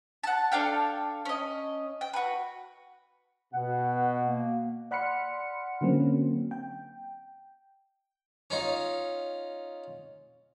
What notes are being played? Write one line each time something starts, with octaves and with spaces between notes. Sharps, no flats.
F#5 A5
D4 A4 F5 G5
C#4 D#5
G5
F#4 B4
B2 F#5
A#3
D5 F#5 B5 C6 F6 C#7
D3 F#3 A#3 C4 C#4
G5
C#4 D#4 F4